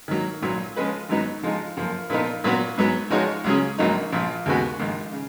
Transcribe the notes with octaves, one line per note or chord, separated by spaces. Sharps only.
D#3 F#3 A#3
B1 A#2 F#3
F3 G#3 C#4 G#4 B4
G#1 G#2 F#3 B3 D#4
F3 G#3 D#4
F#2 F3 A#3
A#2 F3 B3 D#4 A#4
A#2 F#3 B3 F#4
G#2 F#3 B3
F3 G#3 D#4 F#4 C#5
C#2 C#3 F#3 C#4 G#4
A#1 G#2 F#3 A#3 D#4
A#1 A#2 F3
D#2 C#3 G#3 B3 F#4
A#1 G#2 D#3
C#3